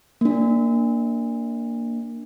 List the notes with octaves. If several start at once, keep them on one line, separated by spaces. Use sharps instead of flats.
A#3 D4